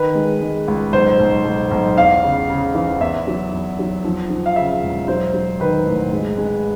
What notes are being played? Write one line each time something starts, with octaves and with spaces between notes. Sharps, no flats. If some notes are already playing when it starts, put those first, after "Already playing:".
Already playing: D#3 B4
G#3
G#3
C#2
B1 C5
B1
B1
B1
E2 F5
C#3
C#3
E3
E2 E5
F#3
E2
F#3
F3
F3
F5
C#3 E5
E1
F#3 C5
F#3
D#3 B4
A1
G#3
G#3